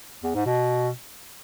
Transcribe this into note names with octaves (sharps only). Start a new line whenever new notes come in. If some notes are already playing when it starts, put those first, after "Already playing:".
E2
G#2
B2